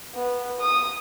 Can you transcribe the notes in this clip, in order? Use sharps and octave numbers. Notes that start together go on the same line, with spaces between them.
B3
D#6